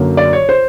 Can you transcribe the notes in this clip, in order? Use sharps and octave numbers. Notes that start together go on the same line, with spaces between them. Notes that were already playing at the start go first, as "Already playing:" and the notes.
Already playing: F#2 D3 F#3 A#3
D5
C#5
C5